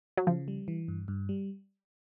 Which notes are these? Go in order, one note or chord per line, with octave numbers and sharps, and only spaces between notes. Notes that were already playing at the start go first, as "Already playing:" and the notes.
F#3
C#3 F3
G3
E3
G2
G2
G3